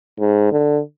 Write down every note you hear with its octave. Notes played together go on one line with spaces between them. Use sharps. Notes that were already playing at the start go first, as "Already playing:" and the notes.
G#2
D3